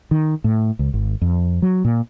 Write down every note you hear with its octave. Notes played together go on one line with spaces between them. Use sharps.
D#3
A2
C#2
G#1
F2
F#3
A#2